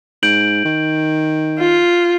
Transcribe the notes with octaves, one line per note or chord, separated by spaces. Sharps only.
G#2 G6 D7 F#7
D#3
F4